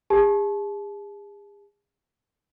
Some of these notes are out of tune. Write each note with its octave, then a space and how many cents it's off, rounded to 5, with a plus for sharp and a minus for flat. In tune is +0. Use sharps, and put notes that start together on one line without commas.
G#4 -40 A5 -35